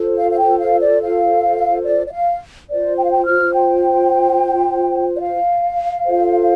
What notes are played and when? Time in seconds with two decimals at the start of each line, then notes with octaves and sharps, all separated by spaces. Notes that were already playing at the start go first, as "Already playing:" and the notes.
Already playing: F4 A4 C5
0.17 F5
0.31 F5
0.38 G5
0.59 F5
0.80 D5
1.02 F5
1.85 D5
2.07 D5
2.13 F5
2.69 F4 C5 D5
2.97 G5
3.04 F5
3.11 G5
3.25 F6
3.53 G5
5.15 D5
5.21 F5
6.05 F4 A4 C5